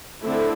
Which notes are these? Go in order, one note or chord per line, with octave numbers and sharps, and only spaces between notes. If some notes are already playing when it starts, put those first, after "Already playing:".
D3 A3 C4 E4